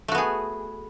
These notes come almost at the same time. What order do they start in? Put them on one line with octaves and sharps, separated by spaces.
A3 F#4 B3 G#4